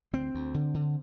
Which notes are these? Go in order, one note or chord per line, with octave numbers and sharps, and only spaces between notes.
D2 C4
D2
D3
D3